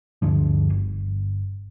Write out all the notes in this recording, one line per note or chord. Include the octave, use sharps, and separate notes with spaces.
D2 G2 D3 F3
G1